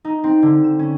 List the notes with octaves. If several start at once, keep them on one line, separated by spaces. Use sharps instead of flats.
D#4
C4
D3
E7
C#4